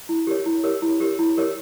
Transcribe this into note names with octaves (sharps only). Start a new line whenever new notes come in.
E4
G4 A#4 C#5
E4
G4 A#4 C#5
E4
G4 A#4 C#5
E4
G4 A#4 C#5